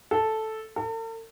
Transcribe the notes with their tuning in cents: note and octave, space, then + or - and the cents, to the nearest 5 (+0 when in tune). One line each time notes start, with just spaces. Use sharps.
A4 -5
A4 +45